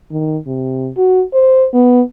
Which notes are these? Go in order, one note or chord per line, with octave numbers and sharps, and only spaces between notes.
D#3
C3
F#4
C5
B3